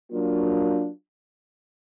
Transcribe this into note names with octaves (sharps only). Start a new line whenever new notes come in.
F#3 A#3 D4 F4